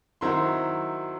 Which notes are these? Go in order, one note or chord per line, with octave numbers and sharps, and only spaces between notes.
D#3 F#3 C4 E4 C6